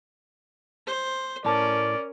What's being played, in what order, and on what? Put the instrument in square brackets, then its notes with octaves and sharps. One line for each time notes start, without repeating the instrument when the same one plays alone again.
[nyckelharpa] C5
[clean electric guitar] A2 A3 A5 [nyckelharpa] C#4 A#4 [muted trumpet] D5